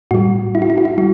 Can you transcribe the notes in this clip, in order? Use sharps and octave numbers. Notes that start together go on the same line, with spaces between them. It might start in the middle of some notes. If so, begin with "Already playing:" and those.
A2 G3 F#4
E4
F#4
E4
F#4
E4
G3 F#4